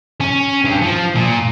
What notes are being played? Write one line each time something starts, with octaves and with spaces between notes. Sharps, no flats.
C#4
G2
F3
A#2